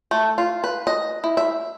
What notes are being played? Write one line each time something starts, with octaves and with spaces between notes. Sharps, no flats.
A3
F4
B4
D#5
E4
E5